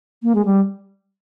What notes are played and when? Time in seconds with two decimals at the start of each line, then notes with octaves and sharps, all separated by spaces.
0.23 A#3
0.35 G#3
0.45 G3